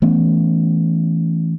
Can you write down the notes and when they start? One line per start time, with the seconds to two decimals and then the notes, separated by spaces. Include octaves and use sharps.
0.02 E3 A3 B3 C#4